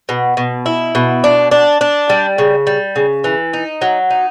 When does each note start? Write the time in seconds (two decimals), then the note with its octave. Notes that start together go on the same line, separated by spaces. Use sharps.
0.09 B2
0.37 B2
0.66 E4
0.95 B2
1.24 D4
1.51 D4
1.81 D4
2.10 G3
2.38 C#3
2.67 G3
2.96 C#3
3.24 E3
3.53 D#4
3.82 F#3
4.10 D#4